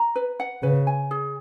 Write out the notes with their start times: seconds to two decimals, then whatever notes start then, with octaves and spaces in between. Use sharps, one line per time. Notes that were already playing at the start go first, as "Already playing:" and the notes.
Already playing: A#5
0.16 B4
0.40 F#5
0.63 C#3 B4
0.87 G#5
1.11 G#4